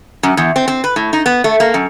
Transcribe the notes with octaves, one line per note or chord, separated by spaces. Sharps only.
F#2
E2
C4
C4
B4
A2
D#4
B3
A3
A#3
F#2